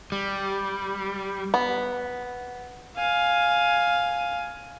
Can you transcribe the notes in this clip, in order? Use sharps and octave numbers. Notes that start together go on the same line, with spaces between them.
G3
B3
F5 G#5